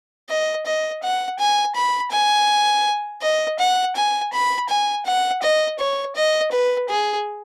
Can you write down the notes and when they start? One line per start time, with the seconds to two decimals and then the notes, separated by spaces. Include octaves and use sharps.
0.29 D#5
0.66 D#5
1.03 F#5
1.39 G#5
1.75 B5
2.12 G#5
3.22 D#5
3.59 F#5
3.96 G#5
4.33 B5
4.69 G#5
5.06 F#5
5.42 D#5
5.79 C#5
6.16 D#5
6.52 B4
6.89 G#4